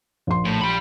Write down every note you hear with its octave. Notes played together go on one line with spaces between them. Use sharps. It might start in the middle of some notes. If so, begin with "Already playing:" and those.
A#1 C6
A2
G4 B5